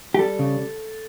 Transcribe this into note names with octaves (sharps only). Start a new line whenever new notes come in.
G4
G3 A4
C#3